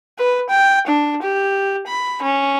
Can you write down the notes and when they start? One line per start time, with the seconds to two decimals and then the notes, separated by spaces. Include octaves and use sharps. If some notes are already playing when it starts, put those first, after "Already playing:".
0.18 B4
0.49 G5
0.87 D4
1.22 G4
1.86 B5
2.23 C#4